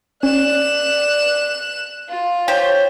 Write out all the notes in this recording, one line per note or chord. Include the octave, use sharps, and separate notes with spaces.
C#4 D5 F#6 E7
F4
G4 C5 C#5